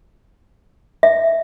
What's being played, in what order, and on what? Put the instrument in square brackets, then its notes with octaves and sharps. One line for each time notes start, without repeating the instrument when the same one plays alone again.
[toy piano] E5